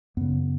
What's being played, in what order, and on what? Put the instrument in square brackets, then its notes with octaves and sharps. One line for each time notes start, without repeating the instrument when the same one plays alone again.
[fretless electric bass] F#2 C#3 B3